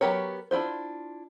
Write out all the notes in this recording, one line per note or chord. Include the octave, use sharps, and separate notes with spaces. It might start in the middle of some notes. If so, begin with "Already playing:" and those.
F#3 B3 G4 A#4 C#5
D4 E4 F4 C5